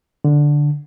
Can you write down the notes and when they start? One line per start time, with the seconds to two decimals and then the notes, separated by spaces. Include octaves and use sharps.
0.24 D3